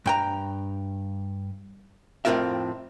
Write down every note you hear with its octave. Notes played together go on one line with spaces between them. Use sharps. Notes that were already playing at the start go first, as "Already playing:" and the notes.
G2 G5 A#5
F2 A2 C4 F4 A#4 E5